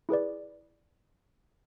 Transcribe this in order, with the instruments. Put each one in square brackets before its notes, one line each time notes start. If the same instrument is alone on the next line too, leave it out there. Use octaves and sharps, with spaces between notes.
[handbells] E4 G#4 B4 D5